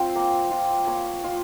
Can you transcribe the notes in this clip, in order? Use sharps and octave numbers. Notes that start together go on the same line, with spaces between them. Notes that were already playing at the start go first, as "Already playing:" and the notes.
Already playing: C4 F4 F5
A#3
F4
A#3 C#5
F4